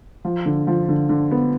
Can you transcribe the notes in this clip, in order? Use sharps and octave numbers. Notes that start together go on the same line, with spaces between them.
F3
D3
F3
D3
D3
B3